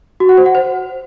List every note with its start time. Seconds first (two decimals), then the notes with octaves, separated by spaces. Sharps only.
0.20 F#4
0.29 F#5
0.38 C5
0.46 F#5
0.55 C5